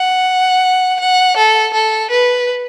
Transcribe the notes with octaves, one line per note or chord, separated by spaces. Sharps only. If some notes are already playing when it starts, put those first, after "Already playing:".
Already playing: F#5
F#5
A4
A4
B4